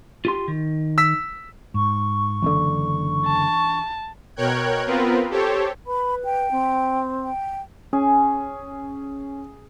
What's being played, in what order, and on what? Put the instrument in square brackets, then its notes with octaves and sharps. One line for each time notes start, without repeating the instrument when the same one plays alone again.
[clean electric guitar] F4 G4 C6
D#3
[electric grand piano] E6 B6
[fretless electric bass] G#2 [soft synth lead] C#6
[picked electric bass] F#1 D3 [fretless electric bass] E3 C4 D4
[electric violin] A5
[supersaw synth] B2 A#4 C#5 G5 F#6 G#6
B3 C4 F4 A#4 B4
G4 A4 C5 C#5
[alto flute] B4 [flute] B5
[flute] G5
[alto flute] C4
[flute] G5
[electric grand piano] C#4 [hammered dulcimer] G#4